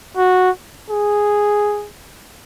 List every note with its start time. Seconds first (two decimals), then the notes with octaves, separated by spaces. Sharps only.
0.17 F#4
0.90 G#4